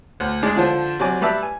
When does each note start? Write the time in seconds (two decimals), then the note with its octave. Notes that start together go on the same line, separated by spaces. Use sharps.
0.20 D2
0.43 G#3 D4 G#4 D5
0.57 D3 F3 D4 F4 C5
1.00 C3 F#3 D5 G#5 D6
1.21 G3 B4 D5 E5 A5 E6
1.43 G#5